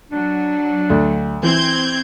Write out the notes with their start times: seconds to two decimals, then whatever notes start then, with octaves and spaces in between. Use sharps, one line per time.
0.12 F#3 D4
0.90 D2
1.43 E3 C4 G6 G#6